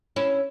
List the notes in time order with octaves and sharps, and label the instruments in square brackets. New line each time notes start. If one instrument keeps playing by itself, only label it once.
[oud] C#4 E4